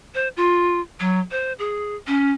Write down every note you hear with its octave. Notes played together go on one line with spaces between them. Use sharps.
C5
F4
F#3
C5
G#4
C#4